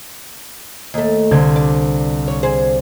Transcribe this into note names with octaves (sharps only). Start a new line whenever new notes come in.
D#2 A3
C2 D3 G#6
D5
C#5
G#4 C5